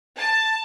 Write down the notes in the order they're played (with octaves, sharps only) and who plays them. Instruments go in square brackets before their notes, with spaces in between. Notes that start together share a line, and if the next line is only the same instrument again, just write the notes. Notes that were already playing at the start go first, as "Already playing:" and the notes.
[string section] A5